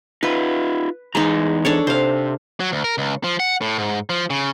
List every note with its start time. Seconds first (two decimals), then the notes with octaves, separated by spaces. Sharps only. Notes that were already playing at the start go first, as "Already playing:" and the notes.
0.23 D#4 F4 B4
1.15 E2 G#3 D#4 A#5
1.65 D4 A4 C#5
1.87 C3 C5 F5
2.60 F#3
2.72 D2
2.84 A#4
2.98 C#2
3.24 F3
3.40 F#5
3.61 A2
3.78 G#2
4.10 F3
4.30 C#3